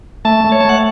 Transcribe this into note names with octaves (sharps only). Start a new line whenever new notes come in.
A3 A5
A3
C#5
A5
A3 F#5